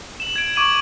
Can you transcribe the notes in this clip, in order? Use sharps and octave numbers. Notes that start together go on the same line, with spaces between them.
E7 F#7
G#6 D7
C#6 D6 G#6 D7 D#7 F#7